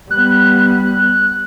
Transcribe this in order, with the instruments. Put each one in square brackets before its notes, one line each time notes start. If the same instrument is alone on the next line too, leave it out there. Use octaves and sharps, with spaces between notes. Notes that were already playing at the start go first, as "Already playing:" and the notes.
[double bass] G3 B3 [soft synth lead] F#6